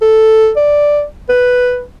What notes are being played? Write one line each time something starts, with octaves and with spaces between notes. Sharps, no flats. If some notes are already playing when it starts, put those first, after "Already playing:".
A4
D5
B4